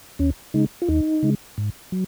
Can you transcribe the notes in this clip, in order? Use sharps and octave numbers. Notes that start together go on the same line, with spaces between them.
D#2 C#4
C#3 G#3 D#4
F4
D#2 D#4
C#3 G#3
G#2
F#3